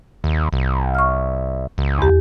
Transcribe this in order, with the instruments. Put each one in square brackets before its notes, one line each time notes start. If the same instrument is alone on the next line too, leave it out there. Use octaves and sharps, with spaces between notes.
[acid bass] D#2
C2
[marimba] C#6 F6
[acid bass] C#2
[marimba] E2 G4